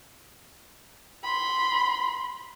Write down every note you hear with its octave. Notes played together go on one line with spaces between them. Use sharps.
B5 C6